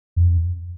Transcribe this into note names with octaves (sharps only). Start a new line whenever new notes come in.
F2